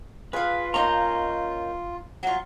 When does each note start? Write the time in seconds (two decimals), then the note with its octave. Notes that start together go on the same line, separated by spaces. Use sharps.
0.33 F4 G#4 B4 F5
0.74 A#3 C#4 D#4 A#5 C6
2.23 F#3 F4